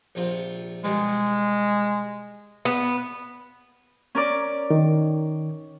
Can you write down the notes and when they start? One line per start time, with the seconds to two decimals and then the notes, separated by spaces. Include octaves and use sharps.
0.15 A#1 C3 F4
0.84 B2 D3 G3 G#3
2.65 B3
4.15 C#4 A#4 D5
4.70 D#3